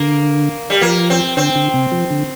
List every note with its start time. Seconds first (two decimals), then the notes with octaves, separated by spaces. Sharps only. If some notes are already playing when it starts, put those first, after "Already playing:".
Already playing: D3 A#3
0.70 G3
0.81 F3 A#3
1.10 C4
1.37 D3 C4
1.56 D3
1.74 C3
1.92 F3
2.10 D3